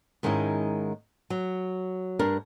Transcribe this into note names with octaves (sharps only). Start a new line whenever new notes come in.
G#2 D#3 G#3 C#4 E4
F#3
G2 D4 A#4